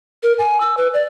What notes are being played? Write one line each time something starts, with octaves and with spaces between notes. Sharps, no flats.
A#4
G#5
E6
B4
D5